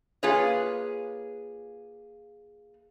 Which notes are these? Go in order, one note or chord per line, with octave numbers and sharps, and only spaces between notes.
A#3 F4 G#4 B4 C#5